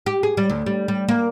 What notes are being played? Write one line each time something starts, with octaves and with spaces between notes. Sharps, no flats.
G4
G#4
G3
D2
G3
G3
A#3